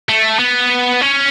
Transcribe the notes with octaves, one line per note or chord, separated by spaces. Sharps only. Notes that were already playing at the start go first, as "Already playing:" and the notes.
A3
B3
C#4